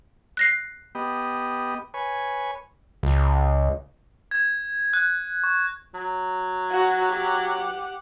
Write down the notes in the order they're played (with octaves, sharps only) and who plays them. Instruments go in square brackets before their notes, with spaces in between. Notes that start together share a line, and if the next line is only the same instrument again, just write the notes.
[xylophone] F#6 A#6 C7
[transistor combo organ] B3 G4 D#5
B4 C#5 G#5
[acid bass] C#2
[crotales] G#6
F#6
C#6
[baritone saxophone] F#3
[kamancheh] F#4
G4 F#5